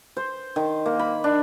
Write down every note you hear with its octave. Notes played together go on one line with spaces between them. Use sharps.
C5
D#3
A#3
B5
D4